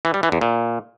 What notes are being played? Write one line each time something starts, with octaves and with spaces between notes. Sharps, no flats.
E3
G3
E3
E2
A#2